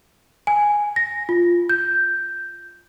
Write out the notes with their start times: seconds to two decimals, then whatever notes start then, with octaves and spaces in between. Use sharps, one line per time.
0.47 G#5
0.96 A#6
1.29 F4
1.69 G6